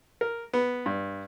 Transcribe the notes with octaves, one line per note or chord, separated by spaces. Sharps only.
A#4
B3
G2